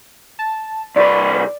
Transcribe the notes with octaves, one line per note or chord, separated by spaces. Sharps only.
A5
C2 B4 D5